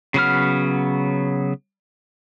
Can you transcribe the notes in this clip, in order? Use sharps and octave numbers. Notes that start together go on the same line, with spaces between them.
C#3 F#3 B3 F6